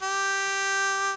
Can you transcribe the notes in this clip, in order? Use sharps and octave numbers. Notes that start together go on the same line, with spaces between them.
G4